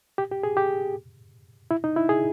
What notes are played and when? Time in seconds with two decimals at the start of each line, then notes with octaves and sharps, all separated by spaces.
0.18 G4
0.31 G4
0.43 G#4
0.57 G4
1.71 E4
1.84 D#4
1.96 E4
2.09 G#4